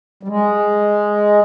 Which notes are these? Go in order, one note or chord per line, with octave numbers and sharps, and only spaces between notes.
G3
G#3